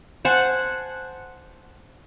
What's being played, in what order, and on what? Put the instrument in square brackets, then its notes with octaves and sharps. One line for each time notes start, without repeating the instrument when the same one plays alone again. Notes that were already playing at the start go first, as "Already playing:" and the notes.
[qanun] C5 F#5 G#5 A5